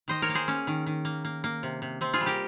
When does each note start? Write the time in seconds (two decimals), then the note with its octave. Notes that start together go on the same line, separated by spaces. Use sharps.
0.08 D#3 C5 D#5
0.22 A#4 C#5
0.29 A#3
0.35 G#4 C5
0.48 A#3 C#4
0.67 D#3
0.86 D#3
1.05 A#3
1.25 A#3
1.44 A#3
1.63 C3
1.82 C3
2.01 C3 C4
2.13 F4 G#4
2.21 G3
2.26 G4 A#4